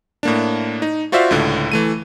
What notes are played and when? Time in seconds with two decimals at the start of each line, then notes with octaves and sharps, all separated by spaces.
0.23 A2 A#3 D4
0.82 D#4
1.12 F4 F#4 C5 D5 E5 F5
1.31 C#2 A2 D3
1.72 E3 A3 D#7